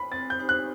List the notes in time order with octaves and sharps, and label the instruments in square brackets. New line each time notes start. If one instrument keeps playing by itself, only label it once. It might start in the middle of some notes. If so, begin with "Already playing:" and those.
Already playing: [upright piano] B5
[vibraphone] C4 [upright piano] A6
[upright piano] G6
[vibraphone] D#4 G4 C5
[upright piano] F#6